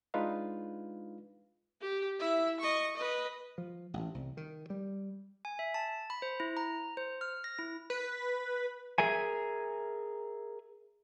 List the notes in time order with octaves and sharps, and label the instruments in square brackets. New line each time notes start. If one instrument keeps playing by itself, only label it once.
[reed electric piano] G#3 D4 D#4 F4 B4 F5
[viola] G4
E4 E5
D#5 C#6
B4 D#5
[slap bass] F3
A1
C2
D#3
G3
[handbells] G#5
E5
A5
B5
C5
E4
A#5
C5
F6
A#6
E4
[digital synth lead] B4
[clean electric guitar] G#4 A#4 E5 G#5